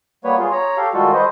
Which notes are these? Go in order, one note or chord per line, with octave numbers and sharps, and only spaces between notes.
G3 A#3 B3 B4 C#5
F4 G#4
C#5 A#5
G4 A4 F5
D#3 G3 G#3 F4 F#4 A4
B4 C5 D#5